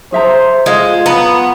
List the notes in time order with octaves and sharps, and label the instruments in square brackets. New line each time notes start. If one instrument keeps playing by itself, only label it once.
[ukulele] G#4 E5 A#5 [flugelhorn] C5
[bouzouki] G#3 [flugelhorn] F4 [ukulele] G#4 F5
[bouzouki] B3 [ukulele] A#5